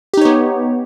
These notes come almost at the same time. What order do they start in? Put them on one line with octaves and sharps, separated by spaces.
G4 D#4 C#5 B3